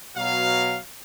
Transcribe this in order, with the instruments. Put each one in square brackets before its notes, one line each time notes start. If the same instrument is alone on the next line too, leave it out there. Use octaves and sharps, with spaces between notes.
[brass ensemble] B2 F#3 F5